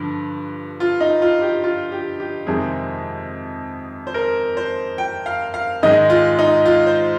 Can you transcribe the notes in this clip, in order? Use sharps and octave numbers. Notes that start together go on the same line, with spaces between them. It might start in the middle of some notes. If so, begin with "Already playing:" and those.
Already playing: G2 D3 F3
F4
D#4
F4
G4
F4
G4
G4
F2 C3 D#3 G#3 C4 G#4
C5
A#4
C5
G5
F5
F5
G#2 D#3 G#3 D#5
F4
D#4
F4
C5